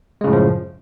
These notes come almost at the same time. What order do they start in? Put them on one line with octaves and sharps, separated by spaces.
G#3 C#3 A2 F#2 F3